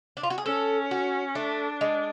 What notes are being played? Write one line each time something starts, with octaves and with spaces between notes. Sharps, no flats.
D4
F4
F#4
G#4
C#4 A4
F#4
A3 D4
G#3